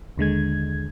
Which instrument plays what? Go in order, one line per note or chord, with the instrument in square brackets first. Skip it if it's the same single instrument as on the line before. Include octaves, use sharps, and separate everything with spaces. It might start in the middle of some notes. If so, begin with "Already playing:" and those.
[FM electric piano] D#2 D3 G#3 G#6